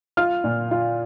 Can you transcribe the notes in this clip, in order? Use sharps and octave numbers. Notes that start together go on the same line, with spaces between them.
F4 F6
A#2
F4